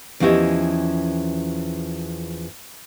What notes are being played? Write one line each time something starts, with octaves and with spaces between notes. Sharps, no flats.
E2 F3 C#4 E4 G4 D#5